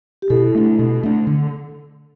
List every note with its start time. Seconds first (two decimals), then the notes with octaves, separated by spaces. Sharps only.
0.22 G4
0.30 B2 E4 A4
0.55 A3 D4
0.79 B2
1.03 A3 D4
1.27 D3